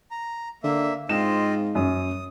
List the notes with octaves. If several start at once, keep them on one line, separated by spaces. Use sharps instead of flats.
A#5
D3 A#3 E5
G#2 C4 F4 D#5 E7
F#2 D#6